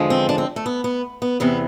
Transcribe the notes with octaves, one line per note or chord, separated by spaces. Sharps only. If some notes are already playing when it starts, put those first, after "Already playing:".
Already playing: E2 D3 F3 G#3
C4
D4
C4
A3
B3
B3
B3
E2 C3 E3 B3